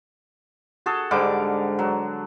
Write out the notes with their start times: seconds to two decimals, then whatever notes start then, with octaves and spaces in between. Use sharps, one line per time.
0.86 F#4 G#4 A4
1.11 G#2 D3 G3 D6
1.79 F#3